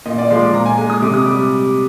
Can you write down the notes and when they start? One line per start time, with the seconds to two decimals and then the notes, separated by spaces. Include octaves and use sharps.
0.06 A#2 D#5
0.18 D5
0.30 F3 G#3 C6
0.42 D6
0.54 A#2 A#5
0.66 G#5
0.77 G#3 G#5
0.90 D#6
1.02 C3 D6
1.14 D#6
1.26 G3 D6